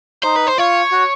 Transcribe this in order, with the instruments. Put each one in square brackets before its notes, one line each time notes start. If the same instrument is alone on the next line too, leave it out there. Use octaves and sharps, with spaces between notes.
[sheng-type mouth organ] D#4 [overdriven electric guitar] C5
[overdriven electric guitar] B4
C5
[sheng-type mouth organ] F4 [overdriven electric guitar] C#5
[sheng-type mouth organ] F#4